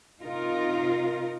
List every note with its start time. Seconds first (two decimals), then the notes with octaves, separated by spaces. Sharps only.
0.22 C3 D#4 F4 A#4